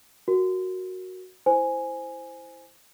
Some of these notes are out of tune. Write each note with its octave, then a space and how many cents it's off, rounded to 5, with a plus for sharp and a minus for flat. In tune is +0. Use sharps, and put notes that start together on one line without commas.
F#4 +0 A#4 +0
E4 +0 C5 -5 G#5 +0